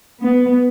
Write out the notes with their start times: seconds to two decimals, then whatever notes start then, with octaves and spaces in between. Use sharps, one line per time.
0.20 B3